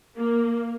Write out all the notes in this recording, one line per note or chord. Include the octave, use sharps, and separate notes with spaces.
A#3